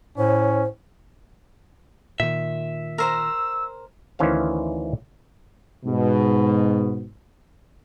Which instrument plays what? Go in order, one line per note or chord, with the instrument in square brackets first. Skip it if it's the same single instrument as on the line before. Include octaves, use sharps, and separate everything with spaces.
[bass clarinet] A2 [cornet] C#4 [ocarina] C5
[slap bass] A#2 D#3 [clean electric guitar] E5
[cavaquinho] A#4 C5 A#5 [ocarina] E6
[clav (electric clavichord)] D2 D#3 E3 C#4 C5 F5
[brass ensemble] G#2 B2